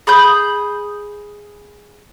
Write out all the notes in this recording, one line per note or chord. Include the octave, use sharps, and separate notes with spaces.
G#4 B5 D#6 G6